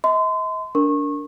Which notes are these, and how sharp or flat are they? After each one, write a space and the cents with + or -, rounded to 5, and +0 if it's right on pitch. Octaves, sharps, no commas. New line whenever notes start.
D#5 +40 C6 -35
D4 -25 A#4 +0 C#6 -30